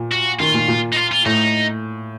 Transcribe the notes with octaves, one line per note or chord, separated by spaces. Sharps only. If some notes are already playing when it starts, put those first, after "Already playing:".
Already playing: A#2
F#4
D#3 F4
A#2
A#2
D#4
F4
F4
A2 D#4